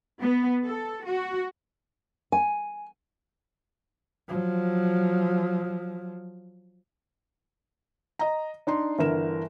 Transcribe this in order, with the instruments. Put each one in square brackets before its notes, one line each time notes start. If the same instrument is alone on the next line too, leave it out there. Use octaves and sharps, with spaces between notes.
[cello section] B3
A4
F#4
[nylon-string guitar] G#5
[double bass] F3 F#3
[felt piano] D#5 A#5
D4 D#4 C6
G1 D3 E3 A#4 E7